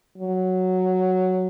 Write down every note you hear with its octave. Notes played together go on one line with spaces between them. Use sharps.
F#3